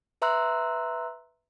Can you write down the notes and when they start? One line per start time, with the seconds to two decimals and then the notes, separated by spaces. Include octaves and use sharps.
0.22 B4 E5 A#5 C6 E6 F#6